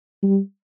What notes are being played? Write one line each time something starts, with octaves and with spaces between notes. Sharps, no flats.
G3